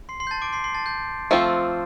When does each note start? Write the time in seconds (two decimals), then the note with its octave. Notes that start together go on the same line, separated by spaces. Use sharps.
0.09 C6 C7
0.20 C6 C7
0.27 G6
0.31 A5 A6
0.42 D6 D7
0.53 C6 C7
0.64 C6 C7
0.75 A5 A6
0.86 G6
1.31 F3 A3 C4 F4